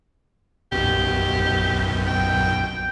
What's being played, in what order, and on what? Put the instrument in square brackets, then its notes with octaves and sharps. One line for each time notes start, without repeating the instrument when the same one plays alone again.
[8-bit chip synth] B1 F#2 B2 [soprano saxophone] G4
[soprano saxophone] G5